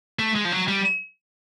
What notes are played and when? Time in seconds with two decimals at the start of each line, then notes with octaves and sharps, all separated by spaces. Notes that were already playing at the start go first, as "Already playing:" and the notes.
0.19 A3
0.36 G#3
0.45 F3
0.52 F#3
0.68 G3